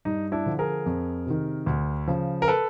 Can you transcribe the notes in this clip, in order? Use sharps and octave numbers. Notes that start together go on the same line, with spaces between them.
G2 D#4
D4 E4
D3 F3
G#4 A#4
F2
C3 D#3
D2
C#3 F3
A#4
A4 B4